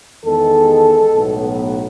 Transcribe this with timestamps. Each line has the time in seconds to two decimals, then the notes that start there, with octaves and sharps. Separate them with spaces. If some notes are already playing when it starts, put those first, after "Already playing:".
0.24 E2 D#3 G#3 A4
1.15 B1 A2 F#3 B3